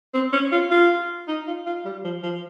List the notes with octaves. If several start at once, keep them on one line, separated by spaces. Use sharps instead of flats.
C4
C#4
F4
F4
D#4
F4
F4
G3
F3
F3